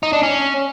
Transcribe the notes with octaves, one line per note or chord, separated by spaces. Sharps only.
D#4
D4
C#4